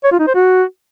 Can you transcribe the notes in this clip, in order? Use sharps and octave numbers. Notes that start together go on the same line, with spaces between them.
C#5
F4
D#4
C5
F#4